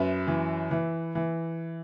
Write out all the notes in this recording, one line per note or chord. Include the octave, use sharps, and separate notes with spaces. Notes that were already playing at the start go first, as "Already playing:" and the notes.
Already playing: F#2 B4 E5
E3
E3
E3